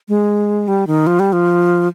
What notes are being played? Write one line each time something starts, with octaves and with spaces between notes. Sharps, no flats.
G#3
G3
D#3
F3
G3
F3